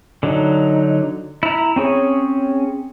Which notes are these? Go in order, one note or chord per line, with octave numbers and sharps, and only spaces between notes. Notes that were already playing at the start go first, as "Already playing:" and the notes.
D3 F#3 D#4
E4 A#5
C4 C#4 G#4 C#5